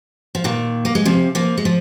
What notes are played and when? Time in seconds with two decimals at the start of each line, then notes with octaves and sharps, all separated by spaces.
0.35 F3
0.44 A#2 D#3
0.85 A#3
0.95 G#3
1.05 C3 F3
1.35 F3 A#3
1.58 G#3
1.65 F3